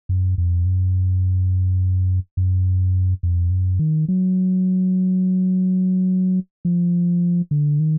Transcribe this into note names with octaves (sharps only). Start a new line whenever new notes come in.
F#2
F2
F#2
F#2
F2
F#2
D#3
F#3
F3
D3
D#3